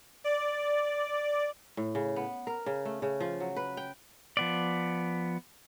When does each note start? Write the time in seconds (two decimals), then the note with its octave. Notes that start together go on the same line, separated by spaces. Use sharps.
0.24 D5
1.77 A2
1.95 C#3
2.16 B3
2.47 A#4
2.66 C#3
2.85 A3
3.02 C#3
3.20 F3
3.40 F#3
3.56 B4
3.77 G5
4.37 F3 B3 D5